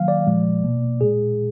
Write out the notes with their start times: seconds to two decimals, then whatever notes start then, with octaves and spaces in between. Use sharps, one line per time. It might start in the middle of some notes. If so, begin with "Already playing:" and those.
Already playing: D#3 F#3 A#3 F5
0.08 D5
0.27 A#2 F3 G#3
0.64 B2 A#3
1.01 A#2 G#3 G#4